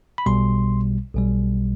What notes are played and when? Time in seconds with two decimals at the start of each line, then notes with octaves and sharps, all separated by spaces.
0.18 B5
0.26 B1 B2 G3 C6
1.15 B1 B2 G3